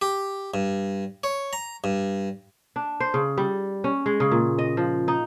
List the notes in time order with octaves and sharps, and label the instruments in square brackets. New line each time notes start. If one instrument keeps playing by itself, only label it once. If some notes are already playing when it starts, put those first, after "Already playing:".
[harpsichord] G4
G2
C#5
A#5
G2
[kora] D4
C5
C#3
G3
C#4
G#3
C#3
A#2
D#5
F3
D#4